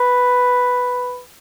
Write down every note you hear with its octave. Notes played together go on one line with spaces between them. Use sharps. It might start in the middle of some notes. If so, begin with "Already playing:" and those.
Already playing: B4